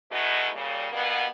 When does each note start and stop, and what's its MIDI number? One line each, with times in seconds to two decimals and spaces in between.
0.11 0.49 47
0.11 0.49 56
0.11 0.49 57
0.11 0.49 63
0.11 0.49 64
0.11 0.49 66
0.54 0.87 46
0.54 0.87 49
0.54 0.87 55
0.92 1.24 43
0.92 1.24 47
0.92 1.24 58
0.92 1.24 59